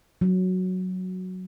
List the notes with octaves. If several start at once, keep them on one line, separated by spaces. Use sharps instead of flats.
F#3